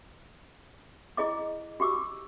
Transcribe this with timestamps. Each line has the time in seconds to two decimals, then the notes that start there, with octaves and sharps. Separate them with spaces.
1.17 E4 G#4 D#5 D6
1.80 F#4 G4 D6 E6